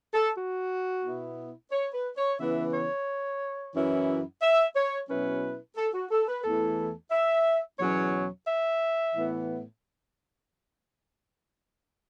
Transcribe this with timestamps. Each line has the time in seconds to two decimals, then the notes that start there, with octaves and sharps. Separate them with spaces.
0.14 A4
0.36 F#4
1.04 B2 B3 E4
1.71 C#5
1.94 B4
2.16 C#5
2.39 C#3 E3 B3 E4 E5
2.72 C#5
3.74 F#2 E3 C#4 E4
4.41 E5
4.75 C#5
5.09 B2 F#3 C#4 E4 B4
5.76 A4
5.94 F#4
6.11 A4
6.28 B4
6.44 E2 E3 A3 E4 A4
7.11 E5
7.79 E2 B2 F#3 C#4 C#5
8.47 E5
9.14 A2 E3 B3 E4